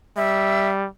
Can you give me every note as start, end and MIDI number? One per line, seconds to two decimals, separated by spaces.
0.17 0.87 55
0.17 0.68 76